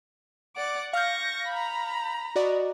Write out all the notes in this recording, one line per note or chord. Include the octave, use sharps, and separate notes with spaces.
D5 F#5 D6
F5 C#6 F6 G6 A#6
A#5 B5
F#4 D5 D#5